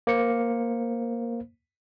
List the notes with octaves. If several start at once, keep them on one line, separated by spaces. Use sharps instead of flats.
A#3 C5 C#7